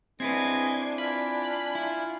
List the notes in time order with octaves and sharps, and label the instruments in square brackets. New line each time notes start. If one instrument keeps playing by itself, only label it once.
[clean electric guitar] C4 E4 B4 [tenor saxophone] D4 [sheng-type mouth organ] G#4 D#5 C6 [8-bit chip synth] G#6
[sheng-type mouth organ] F4 G#5 [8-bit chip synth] B5
[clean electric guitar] E4